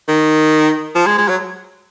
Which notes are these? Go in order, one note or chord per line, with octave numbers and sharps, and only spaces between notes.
D#3
F3
G#3
G#3
F#3